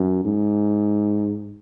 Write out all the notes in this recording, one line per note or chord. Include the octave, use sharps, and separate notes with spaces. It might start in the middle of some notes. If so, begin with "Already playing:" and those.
Already playing: F#2
G#2